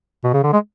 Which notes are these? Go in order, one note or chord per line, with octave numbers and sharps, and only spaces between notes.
B2
C#3
D3
G#3